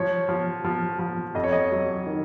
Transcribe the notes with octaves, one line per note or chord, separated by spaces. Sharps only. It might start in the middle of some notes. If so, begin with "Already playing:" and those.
Already playing: F3 C#5
F3
F3
F3
F2 D#5
C#5
D#5
F#3
D#3